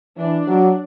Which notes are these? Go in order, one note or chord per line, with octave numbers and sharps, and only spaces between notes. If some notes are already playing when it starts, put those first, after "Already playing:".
E3 D4
F#3